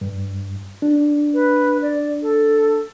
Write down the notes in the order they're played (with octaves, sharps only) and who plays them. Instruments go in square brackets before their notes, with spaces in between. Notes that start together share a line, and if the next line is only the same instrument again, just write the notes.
[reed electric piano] G2
D4
[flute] B4
D5
A4